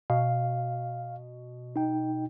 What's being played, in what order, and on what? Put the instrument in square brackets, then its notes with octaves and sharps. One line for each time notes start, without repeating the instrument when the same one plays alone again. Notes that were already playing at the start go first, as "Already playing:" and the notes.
[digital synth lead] B2 [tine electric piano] F5
[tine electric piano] D#4 G5